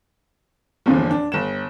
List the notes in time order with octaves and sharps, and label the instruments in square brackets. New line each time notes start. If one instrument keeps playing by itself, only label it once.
[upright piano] G1 E2 A#2 D3 F3
D4
G1 E7